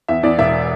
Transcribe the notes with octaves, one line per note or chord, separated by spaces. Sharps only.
E2 E5
E2 D5
E1 E5